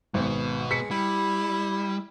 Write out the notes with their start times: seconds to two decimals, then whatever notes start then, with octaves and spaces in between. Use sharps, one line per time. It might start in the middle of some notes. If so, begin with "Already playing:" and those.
0.14 G#1 B2 B3
0.71 G#3 B6 C#7
0.91 G3 E4